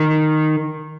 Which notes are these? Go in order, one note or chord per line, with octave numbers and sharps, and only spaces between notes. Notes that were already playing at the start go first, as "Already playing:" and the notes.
Already playing: D#3